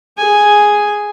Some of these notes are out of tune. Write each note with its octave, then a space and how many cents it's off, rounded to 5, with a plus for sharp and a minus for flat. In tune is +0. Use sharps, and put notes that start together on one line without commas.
G#4 +0 G#5 +0